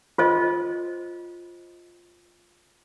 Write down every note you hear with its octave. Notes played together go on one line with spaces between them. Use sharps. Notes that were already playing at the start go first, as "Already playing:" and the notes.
F4 C5 D#5